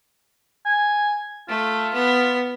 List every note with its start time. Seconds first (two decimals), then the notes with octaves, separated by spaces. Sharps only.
0.65 G#5
1.49 A3 F4
1.94 B3